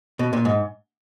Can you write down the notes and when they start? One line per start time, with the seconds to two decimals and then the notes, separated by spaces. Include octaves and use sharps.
0.19 B2
0.33 A#2
0.45 G#2